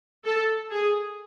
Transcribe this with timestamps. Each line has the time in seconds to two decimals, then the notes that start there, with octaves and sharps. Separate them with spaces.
0.25 A4
0.71 G#4